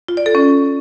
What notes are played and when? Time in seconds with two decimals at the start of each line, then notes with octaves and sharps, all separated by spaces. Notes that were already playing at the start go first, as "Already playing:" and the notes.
0.08 F4
0.17 D5
0.26 A4
0.35 C#4